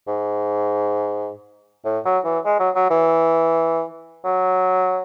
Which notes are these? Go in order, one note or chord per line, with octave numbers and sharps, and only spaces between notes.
G#2
A2
F#3
E3
G#3
F#3
F#3
E3
F#3